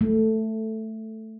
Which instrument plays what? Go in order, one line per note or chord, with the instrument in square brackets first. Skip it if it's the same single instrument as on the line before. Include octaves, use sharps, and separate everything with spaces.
[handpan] A3